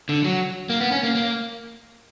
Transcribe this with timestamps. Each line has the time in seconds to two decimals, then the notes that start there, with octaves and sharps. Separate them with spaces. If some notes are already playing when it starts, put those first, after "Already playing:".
0.09 D3
0.24 F#3
0.70 A#3
0.81 B3
0.92 C#4
1.03 A#3
1.15 A#3